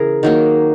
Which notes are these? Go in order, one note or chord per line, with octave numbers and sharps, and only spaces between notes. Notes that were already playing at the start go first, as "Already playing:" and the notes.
Already playing: C#3 E3 G#4 A#4
D#3 F#3 A#3